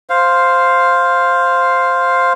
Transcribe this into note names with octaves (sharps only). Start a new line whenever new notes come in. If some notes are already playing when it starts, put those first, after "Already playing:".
C5 F5